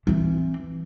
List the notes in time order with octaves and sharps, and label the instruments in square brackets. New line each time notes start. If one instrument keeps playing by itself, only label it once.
[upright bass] E3 C4